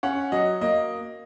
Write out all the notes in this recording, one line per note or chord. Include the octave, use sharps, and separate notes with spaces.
C#4 F#5
F#3 D#5
A#3 D#5